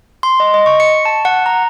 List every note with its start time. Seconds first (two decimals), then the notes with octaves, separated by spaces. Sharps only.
0.23 C6
0.40 D#5
0.54 D#5
0.66 C#6
0.80 C#7
1.05 A5
1.25 F#5
1.46 A#5